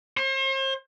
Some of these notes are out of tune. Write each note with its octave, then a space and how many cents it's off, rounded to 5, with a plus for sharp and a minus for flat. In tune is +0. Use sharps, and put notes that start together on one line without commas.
C5 +40